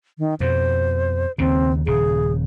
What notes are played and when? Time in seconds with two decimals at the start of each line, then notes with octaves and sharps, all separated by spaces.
0.19 D#3
0.40 F2 B2 C5
1.38 D#2 C#3 C4
1.87 D#1 C#3 G#4